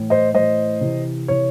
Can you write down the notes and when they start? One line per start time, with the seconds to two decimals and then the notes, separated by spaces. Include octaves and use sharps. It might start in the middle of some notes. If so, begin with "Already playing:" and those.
Already playing: A2 E3
0.10 C5 D#5
0.34 A2 E3 C5 D#5
0.81 C3 E3
1.28 C3 E3 C#5